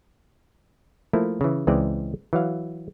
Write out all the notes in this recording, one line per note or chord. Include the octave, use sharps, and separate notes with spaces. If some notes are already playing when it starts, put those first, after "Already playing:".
F3 A3 A#3 E4
C#3 E3
C#2 E3 G#3 C4 D5 D#5
E3 F#3 F5